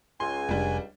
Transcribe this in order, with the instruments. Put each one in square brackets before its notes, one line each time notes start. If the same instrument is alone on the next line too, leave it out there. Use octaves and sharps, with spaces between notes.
[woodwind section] C#2 [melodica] G#5 [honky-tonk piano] C6
[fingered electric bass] F1 [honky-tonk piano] G3 D4